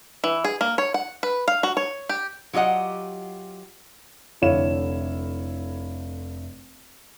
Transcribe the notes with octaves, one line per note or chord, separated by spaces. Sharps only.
E3
G#4
A#3
C#5
F#5
B4
F5
F#4
C#5
G4
F#3 F4 G4 D#5 F#5
F1 D3 E4 C#5 F5 E7